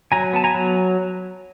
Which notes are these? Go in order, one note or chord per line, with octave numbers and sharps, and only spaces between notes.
F#3 G#5 A#5
B3 A5
G#5 A#5
F#3